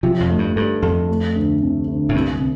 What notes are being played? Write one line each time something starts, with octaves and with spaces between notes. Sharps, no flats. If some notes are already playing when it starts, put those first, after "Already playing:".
C3 F3 F4
F2
A3
G2
G2 A4
F2 A4
A3
D2
C3
D2
A2
C2 G2
C3